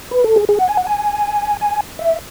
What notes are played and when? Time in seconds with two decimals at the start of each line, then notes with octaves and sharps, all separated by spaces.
0.11 B4
0.24 A4
0.36 G#4
0.49 G#4
0.59 F#5
0.68 G#5
0.77 F#5
0.87 G#5
1.61 G#5
1.99 E5